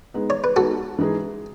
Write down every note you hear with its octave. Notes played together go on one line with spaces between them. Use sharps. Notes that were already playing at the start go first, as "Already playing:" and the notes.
G#3 B3 D#4
C#5
B4
G#3 B3 D#4 F#4 A4
E3 G#3 D#4 G#4